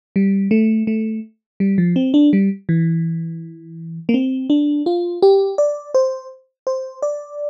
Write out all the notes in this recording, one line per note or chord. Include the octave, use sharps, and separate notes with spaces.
G3
A3
A3
G3
F3
C4
D4
G3
E3
A#3
C4
D4
F4
G4
D5
C5
C5
D5